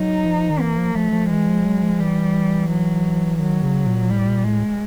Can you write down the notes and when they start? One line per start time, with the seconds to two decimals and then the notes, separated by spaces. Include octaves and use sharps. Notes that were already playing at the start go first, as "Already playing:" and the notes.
Already playing: F#3 D#4
0.25 F3
0.50 D#3
0.60 E3 A#3
0.78 F3
0.95 F3 A3
1.12 F3
1.30 E3 G#3
1.47 F3
1.65 F#3
1.82 F3
2.00 E3 G3
2.70 F#3
3.40 D#3 F#3
3.63 C#3
3.86 A#2
4.10 A2 G3
4.27 A#2
4.44 A2 G#3